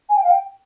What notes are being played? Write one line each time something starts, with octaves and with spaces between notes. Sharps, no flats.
G#5
G5
F5
G5